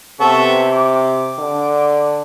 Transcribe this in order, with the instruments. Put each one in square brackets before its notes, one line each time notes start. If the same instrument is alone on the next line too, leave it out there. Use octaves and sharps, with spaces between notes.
[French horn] C3 [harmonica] B3 A4 C#6
[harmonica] D6
[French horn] D3